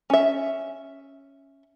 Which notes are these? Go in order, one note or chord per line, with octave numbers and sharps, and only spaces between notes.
C#4 E5